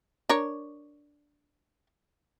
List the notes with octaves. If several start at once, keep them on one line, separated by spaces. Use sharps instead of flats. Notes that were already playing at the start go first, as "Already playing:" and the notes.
D4 A#4 C#5